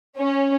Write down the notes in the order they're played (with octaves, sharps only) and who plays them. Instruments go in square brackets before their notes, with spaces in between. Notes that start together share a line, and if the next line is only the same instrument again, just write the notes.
[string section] C#4